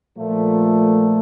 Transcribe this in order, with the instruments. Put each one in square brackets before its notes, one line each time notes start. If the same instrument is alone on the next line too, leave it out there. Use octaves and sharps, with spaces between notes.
[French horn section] A#2 F3 A3